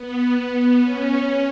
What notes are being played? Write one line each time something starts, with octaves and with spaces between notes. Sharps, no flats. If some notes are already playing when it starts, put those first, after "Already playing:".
Already playing: B3
C#4